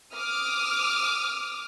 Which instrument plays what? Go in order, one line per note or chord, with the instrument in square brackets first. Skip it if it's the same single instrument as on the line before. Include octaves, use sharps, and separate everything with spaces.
[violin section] D6 D#6 F6